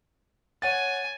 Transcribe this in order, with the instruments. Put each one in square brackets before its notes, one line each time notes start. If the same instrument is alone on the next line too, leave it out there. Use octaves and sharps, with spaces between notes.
[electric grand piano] C#5 F#5 A6 [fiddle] G#5